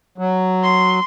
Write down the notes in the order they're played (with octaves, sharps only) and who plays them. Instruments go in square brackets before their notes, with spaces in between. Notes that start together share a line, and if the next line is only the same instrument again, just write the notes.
[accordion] F#3
[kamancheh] C6